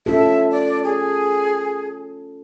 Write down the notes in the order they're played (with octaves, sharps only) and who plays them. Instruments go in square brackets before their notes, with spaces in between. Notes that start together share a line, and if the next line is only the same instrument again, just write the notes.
[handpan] C#4 F4 A4 [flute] E5
[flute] D5
G#4